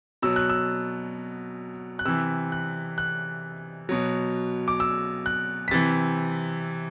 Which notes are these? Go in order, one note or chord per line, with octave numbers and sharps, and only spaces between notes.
B2 F#3 E6
F#6
E6
F#6
C3 E3 E6
F#6
F#6
B2 F#3
D6
E6
F#6
B6
C3 E3 A6